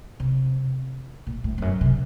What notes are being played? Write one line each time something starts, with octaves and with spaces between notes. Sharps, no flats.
C3
A#2
A2
F2
F#2
C3